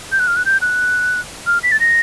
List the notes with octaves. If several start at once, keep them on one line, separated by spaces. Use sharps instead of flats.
G6
F#6
F6
F#6
G6
F#6
F6
B6
A6
A#6